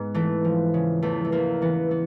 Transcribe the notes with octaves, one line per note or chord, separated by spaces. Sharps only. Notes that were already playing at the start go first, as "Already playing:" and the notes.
Already playing: G#2 B3
E3 A3
F3
C#3
E2 A3
A3
E2 A#3
E3 B3
B3